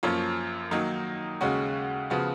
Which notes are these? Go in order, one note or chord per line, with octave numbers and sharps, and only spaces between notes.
F#2 F3 A#3 C#4 F4
D#3 F#3 A#3 D#4
D#2 C#3 G#3 C#4 F#4
C#3 F3 B3 F#4